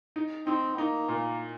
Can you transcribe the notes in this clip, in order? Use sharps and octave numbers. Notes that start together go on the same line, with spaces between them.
D#4
C4 D#4
A#3 D#4
A#2